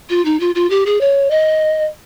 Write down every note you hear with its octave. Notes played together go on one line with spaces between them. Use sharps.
F4
D#4
F4
F4
G4
G#4
C#5
D#5